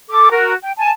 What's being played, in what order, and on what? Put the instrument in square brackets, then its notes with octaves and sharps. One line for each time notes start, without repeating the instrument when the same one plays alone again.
[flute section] A4 D6
F#4 A#4
G5
G#5 A5